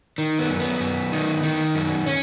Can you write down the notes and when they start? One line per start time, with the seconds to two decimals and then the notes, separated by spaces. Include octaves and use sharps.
0.18 D#3
0.39 B3
0.49 F#2
0.60 B3
0.80 F#2
1.12 D#3
1.43 D#3
1.75 F#2
2.06 C#4